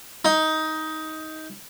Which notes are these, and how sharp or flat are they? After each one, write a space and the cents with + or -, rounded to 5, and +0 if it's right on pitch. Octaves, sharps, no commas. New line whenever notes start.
D#4 +15